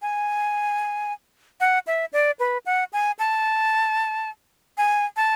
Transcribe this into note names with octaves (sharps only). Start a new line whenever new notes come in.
G#5
F#5
E5
D5
B4
F#5
G#5
A5
G#5
A5